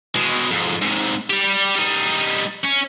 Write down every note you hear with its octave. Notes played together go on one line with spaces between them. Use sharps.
B2 G#3
F2 G#2
G#2 C3
G3 G4
G3 D#4
C#4